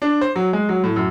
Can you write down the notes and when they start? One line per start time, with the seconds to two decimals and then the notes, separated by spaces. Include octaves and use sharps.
0.02 D4
0.21 C5
0.36 F#3
0.53 G#3
0.69 F#3
0.84 A2
0.96 F#2